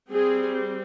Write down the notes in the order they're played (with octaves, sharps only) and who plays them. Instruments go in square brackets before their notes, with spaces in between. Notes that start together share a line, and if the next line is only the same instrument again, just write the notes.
[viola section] G3 C4 G#4